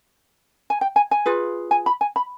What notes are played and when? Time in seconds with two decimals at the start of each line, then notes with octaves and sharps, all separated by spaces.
0.70 G#5
0.81 G5
0.96 G#5
1.11 G#5
1.26 F4 G#4 B4
1.71 G#5
1.86 B5
2.01 G#5
2.16 B5